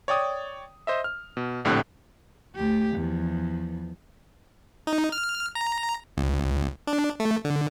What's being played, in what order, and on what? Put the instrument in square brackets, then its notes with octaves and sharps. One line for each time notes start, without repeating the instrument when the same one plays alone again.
[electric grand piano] C#5 D5 G5 D#6
C5 D#5 E5
F6
B2
A#1 A2 D3 C4 G4 F#6
[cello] D2 G4
E2 F3
[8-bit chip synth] D#4
F6
A#5
C#2
D4
A3
D3